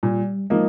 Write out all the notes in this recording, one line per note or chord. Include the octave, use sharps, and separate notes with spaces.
A#2 G3
F3 G#3 A#3 D#4